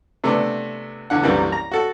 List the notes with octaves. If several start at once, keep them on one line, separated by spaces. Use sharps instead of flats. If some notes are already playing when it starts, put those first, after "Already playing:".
C3 A3 B3 D4
E2 D3 F#5
C2 F#2 D3 E3 G3 A#3
A#5
F#4 A4